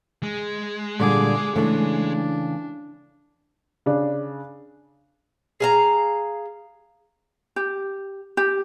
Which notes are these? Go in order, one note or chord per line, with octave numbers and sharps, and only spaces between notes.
G#3
A#2 D3 G3 G#4 D6
C#3 E3 A3 D4
C#3 D4
G#4 F5 A#5
G4
G4